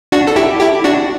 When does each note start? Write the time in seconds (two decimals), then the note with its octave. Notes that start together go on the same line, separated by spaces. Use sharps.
0.12 D4 F#4
0.27 A4
0.36 E4 G4
0.61 E4 G4
0.84 D4 F#4